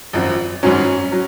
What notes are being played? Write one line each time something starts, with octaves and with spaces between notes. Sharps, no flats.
G#1 F#2 F3
G#1 G#2 F#3 C#4
F#3